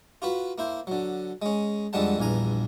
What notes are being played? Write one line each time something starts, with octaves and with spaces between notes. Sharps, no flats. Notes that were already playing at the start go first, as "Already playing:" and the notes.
F4 F#4 B4
A#3 E4 C5
D3 F#3
G#3 C#4
F2 D3 G3 G#3 F#5 A5
A#1 E2 G2 G#5 A#5